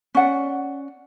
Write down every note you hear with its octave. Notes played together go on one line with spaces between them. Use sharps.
C#4 D5 F#5